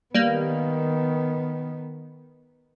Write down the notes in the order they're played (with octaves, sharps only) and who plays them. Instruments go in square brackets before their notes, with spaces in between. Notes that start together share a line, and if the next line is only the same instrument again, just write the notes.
[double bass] D#3 B3 [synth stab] G3 A#3